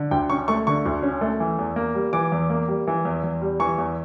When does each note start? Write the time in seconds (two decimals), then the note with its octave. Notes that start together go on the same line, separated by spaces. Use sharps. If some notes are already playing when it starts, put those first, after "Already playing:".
Already playing: D3
0.11 D2 G5
0.30 C#4 C#6
0.48 A3 C#6
0.67 D3 C#6
0.86 D2
1.03 C#4
1.21 A3
1.40 E3
1.59 E2
1.76 A#3
1.95 G3
2.13 E3 D6
2.32 E2
2.50 A#3
2.68 G3
2.87 E3
3.05 E2
3.24 E2
3.42 G3
3.60 E3 C#6
3.78 E2